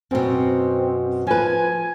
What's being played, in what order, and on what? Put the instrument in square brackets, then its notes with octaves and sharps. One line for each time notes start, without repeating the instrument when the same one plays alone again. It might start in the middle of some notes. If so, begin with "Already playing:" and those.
[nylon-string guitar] F#2 B2 [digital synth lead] C4
[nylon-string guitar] F3 B4 [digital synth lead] G#5